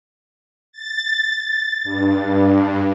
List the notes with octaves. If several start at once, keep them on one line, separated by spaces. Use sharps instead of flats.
A6
G2